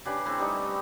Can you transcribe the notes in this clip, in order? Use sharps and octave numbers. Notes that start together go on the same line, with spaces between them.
C#3 D4 G4 B4
A3 C4 E4 B4
G3 D#4 A4